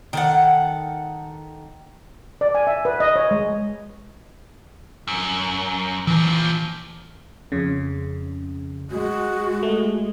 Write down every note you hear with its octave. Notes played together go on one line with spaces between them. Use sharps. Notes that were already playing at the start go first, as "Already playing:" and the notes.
D#3 A4 F#5
D5
G#5
E5
B4
D#5
C#5
G#3
F#2
A#2 E3 F3
F2 C#3
G#3 F#4
A3